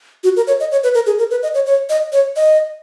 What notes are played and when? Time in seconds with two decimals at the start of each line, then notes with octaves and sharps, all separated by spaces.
0.24 F#4
0.36 A#4
0.47 C#5
0.60 D#5
0.71 C#5
0.83 B4
0.94 A#4
1.06 G#4
1.19 A#4
1.31 B4
1.43 D#5
1.54 C#5
1.66 C#5
1.90 D#5
2.13 C#5
2.36 D#5